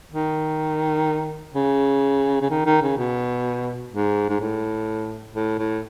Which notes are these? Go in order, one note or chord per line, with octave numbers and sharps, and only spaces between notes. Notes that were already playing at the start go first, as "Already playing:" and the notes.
D#3
C#3
C#3
D#3
D#3
C#3
B2
G#2
G#2
A2
A2
A2